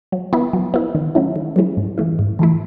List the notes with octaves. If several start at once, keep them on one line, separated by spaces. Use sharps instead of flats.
F#3
B3 E4
F#3
B3 E4
D#3
F#3 A3 C#4 E4
D#3
F#3 A3 C#4 E4
G#2
E3 A3 E4
G#2
E3 A3 E4